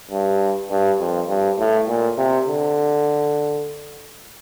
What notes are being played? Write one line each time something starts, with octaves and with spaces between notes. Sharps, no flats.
G2
G2
F2
G2
A2
A#2
C3
D3